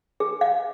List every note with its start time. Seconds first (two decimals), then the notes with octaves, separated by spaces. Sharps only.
0.20 G#4
0.41 F5